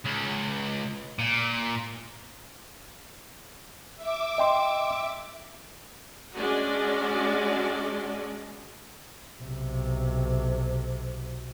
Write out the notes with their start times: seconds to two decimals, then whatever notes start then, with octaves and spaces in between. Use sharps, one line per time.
0.05 C#2
1.19 A#2
3.96 E5 D6
4.38 D#5 G5 C6
6.34 G#3 C#4 D4 F#4 D5
9.40 B1 C3